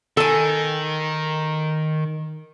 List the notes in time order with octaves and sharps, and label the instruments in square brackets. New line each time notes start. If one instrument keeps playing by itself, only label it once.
[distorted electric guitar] D#3 [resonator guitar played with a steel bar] A4 G#5